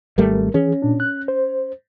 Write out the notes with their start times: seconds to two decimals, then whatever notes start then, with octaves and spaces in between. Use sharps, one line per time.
0.18 G#1 G3 A3 A#4
0.54 E3 C#4 G#4
0.82 A#2 D4
1.00 F#6
1.28 C5